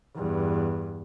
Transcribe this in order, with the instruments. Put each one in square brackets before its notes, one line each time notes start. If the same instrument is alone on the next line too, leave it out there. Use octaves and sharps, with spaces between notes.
[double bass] E2 G2